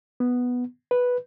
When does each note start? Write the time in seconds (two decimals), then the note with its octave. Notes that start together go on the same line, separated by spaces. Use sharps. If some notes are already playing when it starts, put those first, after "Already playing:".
0.20 B3
0.91 B4